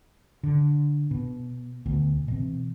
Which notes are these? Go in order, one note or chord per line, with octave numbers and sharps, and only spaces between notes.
D3
B2
D2 B2
B2 E3 C4